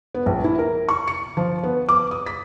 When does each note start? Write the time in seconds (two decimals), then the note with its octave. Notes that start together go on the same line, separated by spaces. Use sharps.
0.15 B3
0.26 A#1
0.44 E4
0.59 A#4
0.89 C#6
1.08 C#7
1.37 F3
1.63 B3
1.89 D6
2.11 D#6
2.26 B6